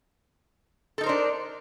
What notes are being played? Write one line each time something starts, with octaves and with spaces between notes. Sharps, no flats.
D4 D#4 A4 A#4 C5